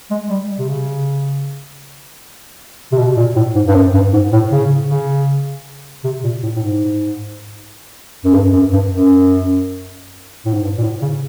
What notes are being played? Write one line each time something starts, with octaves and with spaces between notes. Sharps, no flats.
G#3
G3
C3
C#3
C3
B2
A#2
A2
G#2
G2
F#2
G2
G#2
A2
C#3
C#3
C3
A#2
A2
A2
G#2
F#2
G2
F#2
G2
F#2
A2
G#2
G2
A#2
A2
C#3